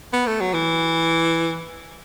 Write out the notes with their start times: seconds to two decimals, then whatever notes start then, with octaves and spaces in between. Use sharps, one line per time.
0.13 B3
0.27 A3
0.40 F#3
0.54 E3